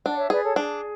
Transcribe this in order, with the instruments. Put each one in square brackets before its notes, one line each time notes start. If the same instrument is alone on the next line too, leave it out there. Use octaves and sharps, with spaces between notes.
[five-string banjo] D4 [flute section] D5 F#5
[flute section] C#5 E5
[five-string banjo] G#4 [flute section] B4 D5
[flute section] A4 C#5
[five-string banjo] D4 [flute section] G#4